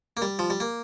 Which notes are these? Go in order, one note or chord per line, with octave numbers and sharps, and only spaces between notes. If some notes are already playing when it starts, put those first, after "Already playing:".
A#3
G3
F3
G3
A#3